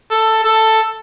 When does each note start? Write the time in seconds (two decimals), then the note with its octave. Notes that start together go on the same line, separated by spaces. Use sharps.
0.11 A4
0.44 A4